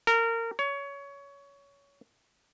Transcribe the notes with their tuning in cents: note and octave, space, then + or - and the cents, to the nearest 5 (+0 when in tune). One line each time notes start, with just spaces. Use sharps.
A#4 -25
C#5 +20